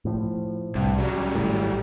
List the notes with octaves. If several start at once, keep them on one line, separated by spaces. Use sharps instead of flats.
A2 F3
C2 G2
C#3 F#3 G3
G#1 A2